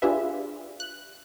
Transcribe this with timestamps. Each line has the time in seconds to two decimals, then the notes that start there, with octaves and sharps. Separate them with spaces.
0.02 D4 F4 G4 G#4 B4 E5
0.80 F#6